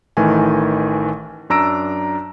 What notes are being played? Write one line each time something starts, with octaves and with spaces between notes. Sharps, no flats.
A1 D#3 E3 A3 G#5
F#2 D4 A#5 E6 A#6 D7